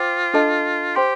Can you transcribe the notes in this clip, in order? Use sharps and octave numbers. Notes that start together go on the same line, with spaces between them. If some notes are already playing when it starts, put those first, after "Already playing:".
Already playing: F4 C5 G5 D6
D4 A4 D#5 A5
G4 C5 G5 C6